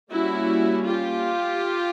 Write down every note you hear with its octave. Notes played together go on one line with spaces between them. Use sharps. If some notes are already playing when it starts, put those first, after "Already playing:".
G3 A#3 C#4 E4 F#4
F4 G4